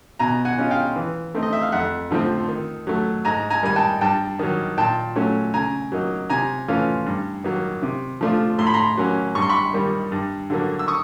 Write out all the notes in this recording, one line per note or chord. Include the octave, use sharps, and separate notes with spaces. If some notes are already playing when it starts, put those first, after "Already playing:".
B2 G#5 A#5
F#5 G#5
G#3 C#4 F4
F5 G5
E3
A3 C4 D#4
D#5
E5
F5
F2 E5 F#5
D3 F3 A3 C4
D#3
F#3 A3
G#2 G#5 A#5
G#5 A#5
D#3 G3 G#5
G5 A5
G2 G5 A5
D#3 F#3
A#2 G5 A5
F#3 A3 C#4
C#3 G#5 A#5
F#3 A#3 D#4
C3 G#5 A#5
E3 A3 C#4 F4
G2
D#3 F#3 A#3
C3
F3 A3 D4 F4
A2 C6
B5
A#5 C6
F#3 A#3 C#4
G2 C#6
C6
B5 C#6
D#3 G3 A#3
G2
D3 F#3 A#3
E6
C#6 D#6